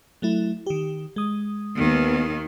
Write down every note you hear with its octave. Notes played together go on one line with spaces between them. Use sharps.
F#3 A3 E4
D#3 G4
G#3 D#6
D#2 D#3 B3